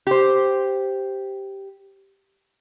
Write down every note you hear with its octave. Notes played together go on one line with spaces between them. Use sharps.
G4 C5